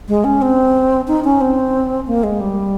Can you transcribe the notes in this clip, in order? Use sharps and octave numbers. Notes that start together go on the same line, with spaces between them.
G#3
C#4
C4
D#4
C#4
C4
A#3
G#3
G3